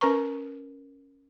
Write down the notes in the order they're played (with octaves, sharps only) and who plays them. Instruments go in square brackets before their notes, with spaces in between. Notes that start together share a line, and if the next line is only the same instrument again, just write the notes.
[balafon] C#4 A#4 B4 A#5 C#6